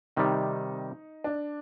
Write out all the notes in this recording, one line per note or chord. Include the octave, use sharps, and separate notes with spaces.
C3 D#3 G3 D#4
D4